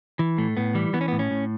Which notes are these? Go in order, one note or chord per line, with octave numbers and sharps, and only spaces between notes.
E3
A2 A3
A2 B3
E3 G3
E3 B3
C#4
A2 B3
C#4
A2